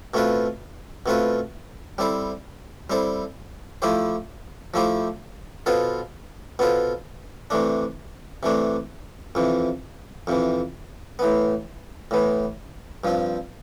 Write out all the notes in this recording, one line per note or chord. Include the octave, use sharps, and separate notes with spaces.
B2 A3 C4 F4 B4
B2 A3 C4 F4 B4
G3 C4 E4 A4 C5
G3 C4 E4 A4 C5
F3 A3 E4 G4 C5
F3 A3 E4 G4 C5
B2 B3 F4 A4 C5
B2 B3 F4 A4 C5
C3 E3 A3 D4
C3 E3 A3 D4
F2 C3 E3
F2 C3 E3
A2 E3 B3
A2 E3 B3
G2 F3 C4